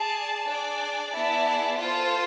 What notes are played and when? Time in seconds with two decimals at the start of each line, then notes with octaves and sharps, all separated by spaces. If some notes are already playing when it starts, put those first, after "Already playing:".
Already playing: G#4 D5 A5
0.47 D4 G#4 D5
1.12 B3 E4 G#4 D5 A5
1.77 F4 A4 C5